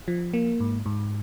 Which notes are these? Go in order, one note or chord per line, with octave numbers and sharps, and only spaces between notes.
F3
A#3
G#2
G#2